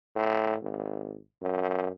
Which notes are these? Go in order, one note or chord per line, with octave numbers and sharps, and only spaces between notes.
A2
G#1
F#2